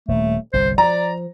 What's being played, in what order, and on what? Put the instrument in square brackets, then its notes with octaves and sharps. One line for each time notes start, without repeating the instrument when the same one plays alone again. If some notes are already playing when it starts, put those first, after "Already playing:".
[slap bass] D#1 [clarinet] A3
[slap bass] G1 C2 [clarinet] C5
[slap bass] F3 [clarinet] D5 [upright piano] A#5